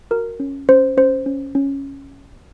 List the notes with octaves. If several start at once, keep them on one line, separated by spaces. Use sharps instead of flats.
F#4 A#4
C#4
C#4 C5
C#4 C5
C#4
C#4